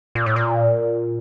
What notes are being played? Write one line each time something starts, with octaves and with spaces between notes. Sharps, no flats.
A#2
A2
A#2